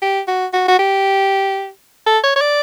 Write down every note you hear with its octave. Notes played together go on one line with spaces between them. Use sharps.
G4
F#4
F#4
F#4
G4
A4
C#5
C#5
D5